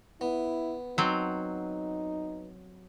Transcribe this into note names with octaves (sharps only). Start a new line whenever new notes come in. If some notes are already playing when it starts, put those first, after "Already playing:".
B3 E4
F#3 C4 D#4